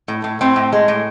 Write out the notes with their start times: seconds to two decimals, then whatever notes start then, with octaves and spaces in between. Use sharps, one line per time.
0.08 A2
0.24 A2
0.41 A2 C4
0.56 A2
0.72 G#3
0.88 A2